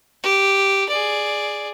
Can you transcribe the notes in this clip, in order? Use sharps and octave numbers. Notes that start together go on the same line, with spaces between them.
G4
G#4 D5